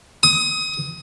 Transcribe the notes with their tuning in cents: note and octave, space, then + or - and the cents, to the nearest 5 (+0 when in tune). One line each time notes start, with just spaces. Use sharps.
D#6 +25